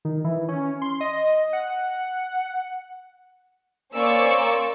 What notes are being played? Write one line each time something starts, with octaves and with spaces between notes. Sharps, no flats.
D#3
E3
C#4
C6
D#5
F#5
A#3 C#4 C5 D5 C#6 E6